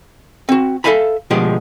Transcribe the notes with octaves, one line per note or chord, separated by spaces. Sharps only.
C4 F#4
A4 C5 E5 F5 G#5 B5
D2 B2 F3 G#3 G4 G5